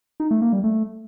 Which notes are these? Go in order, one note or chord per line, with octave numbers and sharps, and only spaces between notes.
D#4
A3
A#3
G3
A3